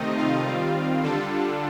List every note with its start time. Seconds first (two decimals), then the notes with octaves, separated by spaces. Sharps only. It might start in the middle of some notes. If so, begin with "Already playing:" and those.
Already playing: C3 D#3 A3 C4 D#4 D#5
0.17 F4 F5
0.46 D#3 G3 C4
1.03 D3 G3 D4 F4 A4